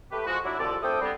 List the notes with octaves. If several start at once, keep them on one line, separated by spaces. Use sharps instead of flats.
A3 G4 B4
F3 G#3 F#4
F#3 D4 E4
C2 F2 D3 F3 A4 D5
A3 C4 D4 A4 G5 D#6
D3 G3 B3 C4